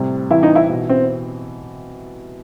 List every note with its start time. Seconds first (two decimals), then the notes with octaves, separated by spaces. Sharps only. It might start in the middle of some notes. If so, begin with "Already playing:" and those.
Already playing: A2 C3 G3
0.31 E3 E4
0.43 D#4
0.55 E4
0.70 B2
0.89 C4